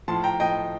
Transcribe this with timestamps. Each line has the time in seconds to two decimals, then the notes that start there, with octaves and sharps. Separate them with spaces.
0.08 A2 F3 A5 C6
0.24 G5 A#5
0.40 A2 F3 D#5 G5